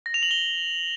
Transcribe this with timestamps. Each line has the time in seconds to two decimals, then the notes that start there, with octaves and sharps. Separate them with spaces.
0.06 A#6
0.14 F7
0.23 F#7
0.31 G7